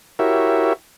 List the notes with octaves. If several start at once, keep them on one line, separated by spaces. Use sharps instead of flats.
E4 F#4 G4 A#4 C#5 E5